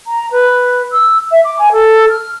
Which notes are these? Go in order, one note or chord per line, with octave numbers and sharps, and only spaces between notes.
A#5
B4
E6
E5
D6
G#5
A4
F6